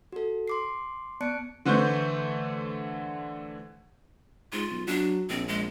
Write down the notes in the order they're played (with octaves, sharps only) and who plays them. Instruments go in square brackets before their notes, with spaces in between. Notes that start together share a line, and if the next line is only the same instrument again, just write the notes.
[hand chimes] F#4 A4
C6 D6 C7
B3 D5 A5 F#6 C#7 D7
[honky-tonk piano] D3 E3 A3 C5 C#6 G6
[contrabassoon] G#2 [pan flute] F4
[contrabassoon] B1
[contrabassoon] F#3 [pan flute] D4
[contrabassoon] A#1 [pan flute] C4
[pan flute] G#3